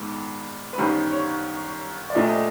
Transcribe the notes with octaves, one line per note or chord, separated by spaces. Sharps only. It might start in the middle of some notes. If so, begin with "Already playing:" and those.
Already playing: A#1 G#2 D#3 G#3 B3
B4
G1 F#2 D#3 G3 C5
C#5
D5
A#1 A#2 F3 A3 D#5
D#5